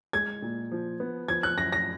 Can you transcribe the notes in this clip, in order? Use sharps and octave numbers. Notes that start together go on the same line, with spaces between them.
G#3 G#6
A#2
F3
B3
F3 G#6
F#6
F#2 A#6
A#6